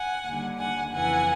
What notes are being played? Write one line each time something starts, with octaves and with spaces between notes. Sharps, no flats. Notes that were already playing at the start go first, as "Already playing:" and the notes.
Already playing: F#5 G#5
D#2 D3 G3
F#5 G#5
F2 C#3 E3 F#5 G#5